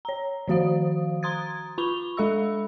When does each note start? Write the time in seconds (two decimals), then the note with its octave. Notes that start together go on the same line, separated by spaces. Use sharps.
0.05 C#5 A#5
0.48 D#3 F3 F#4 C5 F5 D#6
1.23 A#5 C6 D#6 G#6 A6
1.78 F4 B5 C#6 F7 G7
2.17 G#3 A4 E5 B5 E6